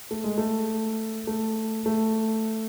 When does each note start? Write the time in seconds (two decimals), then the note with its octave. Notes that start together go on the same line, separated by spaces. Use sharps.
0.11 A3
0.24 G#3
0.38 A3
1.27 A3
1.86 A3